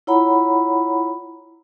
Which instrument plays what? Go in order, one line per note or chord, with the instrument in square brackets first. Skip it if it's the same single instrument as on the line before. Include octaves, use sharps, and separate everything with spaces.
[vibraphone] E4 F4 C#5 F#5 A#5 B5